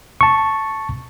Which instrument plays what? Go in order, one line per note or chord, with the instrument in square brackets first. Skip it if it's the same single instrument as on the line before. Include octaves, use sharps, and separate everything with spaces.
[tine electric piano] A5 C#6